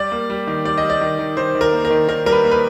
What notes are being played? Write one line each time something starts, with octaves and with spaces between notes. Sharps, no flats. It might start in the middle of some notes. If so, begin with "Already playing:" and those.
Already playing: G3 D5
A#3
G3
D#3
G3 D5
D#5
G3
D5
D#3
D#3
D#3 C5
D#3
A#4
A#3
A#4
D#3
D#3 A#4
G3 A#4
B4
A#3
B4